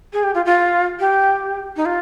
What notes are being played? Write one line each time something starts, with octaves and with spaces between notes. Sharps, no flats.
G#4
G4
F4
F4
G4
D#4
F4